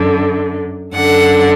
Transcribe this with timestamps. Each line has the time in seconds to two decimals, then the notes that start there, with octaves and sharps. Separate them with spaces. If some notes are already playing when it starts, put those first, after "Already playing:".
Already playing: F#2 D3
0.93 F#2 D3 F#5